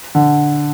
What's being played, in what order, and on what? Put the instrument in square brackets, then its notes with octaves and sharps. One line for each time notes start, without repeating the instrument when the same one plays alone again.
[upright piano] D3